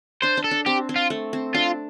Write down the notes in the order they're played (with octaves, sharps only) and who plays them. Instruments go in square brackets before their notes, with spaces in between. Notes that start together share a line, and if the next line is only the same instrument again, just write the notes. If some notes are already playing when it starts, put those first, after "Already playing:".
[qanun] D4 [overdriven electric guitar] C5
[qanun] D4
[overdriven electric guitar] A4
[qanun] D4
[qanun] C4 [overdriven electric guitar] G4
[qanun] C4
[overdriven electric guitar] F4
[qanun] A3
C4
[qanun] D4 [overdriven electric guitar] F4